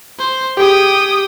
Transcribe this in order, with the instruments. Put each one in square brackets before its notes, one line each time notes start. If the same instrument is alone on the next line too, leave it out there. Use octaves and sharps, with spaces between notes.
[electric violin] C5
[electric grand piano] G4 G#4 [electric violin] G5 D#6